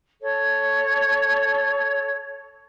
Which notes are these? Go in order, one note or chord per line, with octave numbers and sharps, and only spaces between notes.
A4 C#5